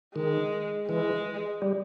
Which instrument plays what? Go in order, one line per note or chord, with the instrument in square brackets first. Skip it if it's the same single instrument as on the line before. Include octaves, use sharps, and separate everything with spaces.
[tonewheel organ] D#3 [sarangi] G#3
[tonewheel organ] E3 [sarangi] G#3
[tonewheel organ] G3